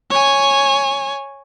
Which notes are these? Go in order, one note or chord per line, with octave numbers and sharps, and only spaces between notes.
C#5 G#5